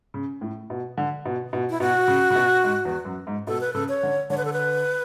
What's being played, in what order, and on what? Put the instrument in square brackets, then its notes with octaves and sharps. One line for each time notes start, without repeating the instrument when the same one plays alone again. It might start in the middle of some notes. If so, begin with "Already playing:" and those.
[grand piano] C#3
A2
B2
D3
B2
B2
[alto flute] E4
[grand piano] B2 [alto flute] F#4
[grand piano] C#3
C#3
B2
G#2
E2
F#2
G#2
[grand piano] B2 [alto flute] A4
[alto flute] B4
[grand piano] C#3 [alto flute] A4
[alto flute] C#5
[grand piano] D3
[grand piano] D3 [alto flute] C#5
[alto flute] B4
A4
B4